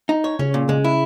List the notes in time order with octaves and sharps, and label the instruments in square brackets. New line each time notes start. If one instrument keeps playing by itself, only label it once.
[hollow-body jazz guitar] D#4
C#5
[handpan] C#3 [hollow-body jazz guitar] C#4
[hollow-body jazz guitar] A#2
[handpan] C#3 [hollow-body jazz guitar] G#3
[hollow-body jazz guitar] E4